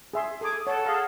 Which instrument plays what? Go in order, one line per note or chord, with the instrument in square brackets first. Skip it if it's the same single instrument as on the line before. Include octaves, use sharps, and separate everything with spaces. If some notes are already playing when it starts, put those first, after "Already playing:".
[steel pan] G#4 E5 C6
[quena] G#4 [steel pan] A4 D6
[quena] A4 [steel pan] C#5 [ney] F#5
[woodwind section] G#4 F5 [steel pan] A#5